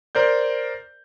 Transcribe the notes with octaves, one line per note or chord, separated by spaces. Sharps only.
A#4 C5 D5 G6